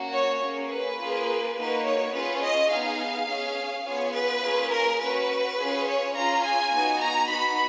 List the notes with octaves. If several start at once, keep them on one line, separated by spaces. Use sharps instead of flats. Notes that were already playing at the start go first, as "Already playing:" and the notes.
Already playing: A#3 C#4 F#4
C#5
A#3 C#4 G#4
B4
A#3 F4 G#4
A#3 D#4 F#4 B4
C#5
C#4 F4 G#4 B4
D#5
B3 D#4 G#4 F5
C#4 G#4
B3 F4 G#4 C#5
B4
A#3 C#4 F4 G#4
A#4
C#4 F#4 B4
C#4 F4 G#4
C#5
C#4 F4 G#4 A#5
G#5
B3 D#4 F#4
A#5
B3 D#4 F#4 B5